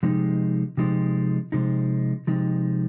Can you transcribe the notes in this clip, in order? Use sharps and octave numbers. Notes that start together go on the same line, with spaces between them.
C3 F3 G#3 D#4
C3 F3 G#3 D#4
C3 F3 G#3 D#4
C3 F3 G#3 D#4